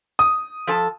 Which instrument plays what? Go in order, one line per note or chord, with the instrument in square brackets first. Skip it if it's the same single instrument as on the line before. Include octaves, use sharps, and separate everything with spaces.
[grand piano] D#6
[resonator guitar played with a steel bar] F3 A4 A5